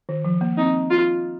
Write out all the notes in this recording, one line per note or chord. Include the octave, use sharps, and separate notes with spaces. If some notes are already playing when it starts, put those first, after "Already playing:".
D#3
F3
A#3
C4 D#4
F4